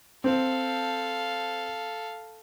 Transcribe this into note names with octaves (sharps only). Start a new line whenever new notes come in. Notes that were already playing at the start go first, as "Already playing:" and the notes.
C4 A4 F5